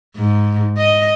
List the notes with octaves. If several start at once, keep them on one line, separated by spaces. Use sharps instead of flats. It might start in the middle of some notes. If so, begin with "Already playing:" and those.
G#2
D#5